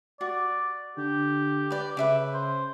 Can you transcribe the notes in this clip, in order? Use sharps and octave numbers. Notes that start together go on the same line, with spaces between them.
F#4 D5
D3 G4
B4 D5
C#3 B4 E5 D6
C5